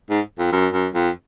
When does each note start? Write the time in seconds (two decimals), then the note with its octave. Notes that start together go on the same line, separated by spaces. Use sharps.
0.10 G#2
0.39 F2
0.53 F#2
0.73 F#2
0.94 F2